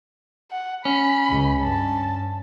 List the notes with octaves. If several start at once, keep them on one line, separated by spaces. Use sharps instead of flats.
F#5
C#4 B5
C#2
G2 A5